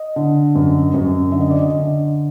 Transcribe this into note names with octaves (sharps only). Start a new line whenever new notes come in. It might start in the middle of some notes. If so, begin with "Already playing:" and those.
Already playing: D#5
D3
F#2
F#2
D3 E5
D#5
D5
D#5
D3